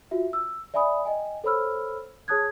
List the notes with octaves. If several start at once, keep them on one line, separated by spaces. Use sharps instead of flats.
F4 F#4 E5
E6
D5 E5 G#5 B5 D#6
D#5 G5 G#5
A4 C5 C#5 B5 E6 F6
G#4 C#5 A5 D#6 F#6 G#6